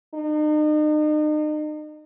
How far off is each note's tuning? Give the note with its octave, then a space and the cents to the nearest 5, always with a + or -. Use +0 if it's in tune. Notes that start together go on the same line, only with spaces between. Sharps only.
D#4 -40